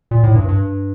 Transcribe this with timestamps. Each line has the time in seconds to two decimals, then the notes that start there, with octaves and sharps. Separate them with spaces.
0.11 A#2
0.23 A2
0.36 G2
0.48 G2